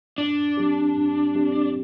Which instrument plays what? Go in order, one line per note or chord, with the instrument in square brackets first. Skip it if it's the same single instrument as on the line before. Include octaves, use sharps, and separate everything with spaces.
[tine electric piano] G2 [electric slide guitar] D4
[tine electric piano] F#3 C4 G4
G2
F#3 C4 G4